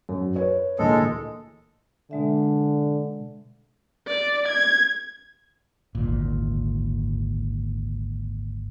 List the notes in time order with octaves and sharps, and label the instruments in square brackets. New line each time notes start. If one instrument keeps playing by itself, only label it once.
[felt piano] F#2
B4 C#5
[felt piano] D2 A#2 E3 [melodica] G#3 A4
[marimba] B2 G#3 E5 [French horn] D3
[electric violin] D5
G#6
[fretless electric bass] G#1 D2 A#2